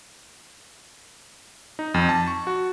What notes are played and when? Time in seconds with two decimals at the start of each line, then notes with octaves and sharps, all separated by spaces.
1.79 D#4
1.94 F2
2.09 A5
2.28 C#6
2.47 F#4